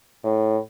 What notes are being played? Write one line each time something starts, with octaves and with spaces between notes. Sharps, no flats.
A2